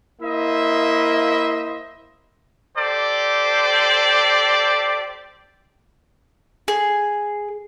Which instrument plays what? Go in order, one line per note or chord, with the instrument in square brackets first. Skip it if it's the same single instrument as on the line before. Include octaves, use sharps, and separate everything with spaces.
[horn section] A#3 E4 C5 D#5 E5
[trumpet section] G4 A4 C5 D5
[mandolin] G#4